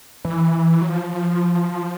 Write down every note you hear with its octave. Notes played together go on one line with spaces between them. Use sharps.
E3
F#3
F3